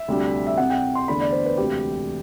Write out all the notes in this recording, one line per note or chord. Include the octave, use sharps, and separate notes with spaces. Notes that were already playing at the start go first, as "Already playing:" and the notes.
Already playing: E5
D2 C3 G3 D4
E5
C2 C3 G3 F#5
G5
C6
E2 D3 A3 D4 B5
D5
C5
B4
E1 D2 C3 G4